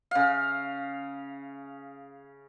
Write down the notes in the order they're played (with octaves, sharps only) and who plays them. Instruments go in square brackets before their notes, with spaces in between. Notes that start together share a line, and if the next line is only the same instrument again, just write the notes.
[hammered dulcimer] C#3 F5